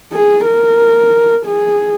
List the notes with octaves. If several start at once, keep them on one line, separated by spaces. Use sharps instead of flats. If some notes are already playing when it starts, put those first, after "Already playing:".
G#4
A#4
G#4